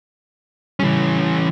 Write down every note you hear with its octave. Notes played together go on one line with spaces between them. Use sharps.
C#3 E3 G3 C#4